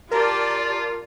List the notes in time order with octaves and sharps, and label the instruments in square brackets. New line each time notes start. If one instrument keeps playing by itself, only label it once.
[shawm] F4 [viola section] G4 D5 A5 [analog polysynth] A#4